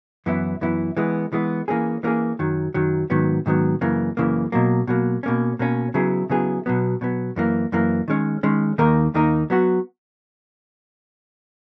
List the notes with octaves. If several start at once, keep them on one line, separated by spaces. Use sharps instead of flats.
F#2 E3 B3 E4
F#2 E3 B3 E4
E3 G#3 B3
E3 G#3 B3
E3 A#3 C#4 G#4
E3 A#3 C#4 G#4
F#2 D#3 F#3
F#2 D#3 F#3
G#2 D#3 F#3 B3
G#2 D#3 F#3 B3
F#2 C#3 E3 A#3
F#2 C#3 E3 A#3
B2 F#3 A#3
B2 F#3 A#3
B2 A#3 C#4
B2 A#3 C#4
C#3 F#3 B3 E4 G#4
C#3 F#3 B3 E4 G#4
B2 F#3 B3
B2 F#3 B3
F#2 E3 A#3
F#2 E3 A#3
D#3 G#3 C#4
D#3 G#3 C#4
D#2 D#3 A#3 D#4 A#4
D#2 D#3 A#3 D#4 A#4
F#3 B3 F#4